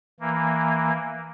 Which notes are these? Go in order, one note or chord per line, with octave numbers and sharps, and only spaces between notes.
E3 A#3